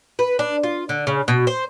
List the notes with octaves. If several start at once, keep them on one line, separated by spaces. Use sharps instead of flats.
B4
D4
F4
D3
C#3
B2
C5